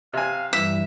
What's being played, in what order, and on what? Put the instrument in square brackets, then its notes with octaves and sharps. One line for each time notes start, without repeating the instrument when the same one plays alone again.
[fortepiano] C3 G#5 [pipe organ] F5
[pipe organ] G2 E3 [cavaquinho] E5